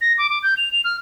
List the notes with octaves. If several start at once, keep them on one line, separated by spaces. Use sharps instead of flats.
A#6
D6
D6
G6
F7
F7
F6